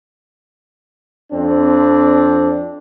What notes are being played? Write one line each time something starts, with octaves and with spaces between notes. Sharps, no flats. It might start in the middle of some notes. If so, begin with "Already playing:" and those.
F2 C4 D4